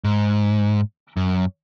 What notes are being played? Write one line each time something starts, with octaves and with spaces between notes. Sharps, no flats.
G#2
F#2